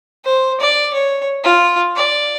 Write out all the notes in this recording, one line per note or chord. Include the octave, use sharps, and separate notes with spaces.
C5
D5
C#5
F4
D5